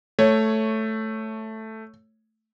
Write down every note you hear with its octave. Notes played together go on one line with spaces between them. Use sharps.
A3 C#5